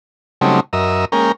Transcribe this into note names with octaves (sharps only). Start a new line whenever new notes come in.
C#3 F#3 G3 A3 C4 D#4
F#2 A#4 D#5 E5
G#3 A#3 C#4 A#4 G5